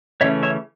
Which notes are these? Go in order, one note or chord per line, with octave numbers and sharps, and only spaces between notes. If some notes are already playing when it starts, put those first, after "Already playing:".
C#3 E3 A3 C#4 C#5 E5
C#5 E5